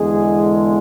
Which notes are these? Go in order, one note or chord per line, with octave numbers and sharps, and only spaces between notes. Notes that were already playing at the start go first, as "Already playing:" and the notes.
Already playing: E2 D3 G#3 G#4